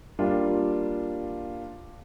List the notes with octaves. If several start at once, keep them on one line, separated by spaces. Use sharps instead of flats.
G3 A#3 D4 F4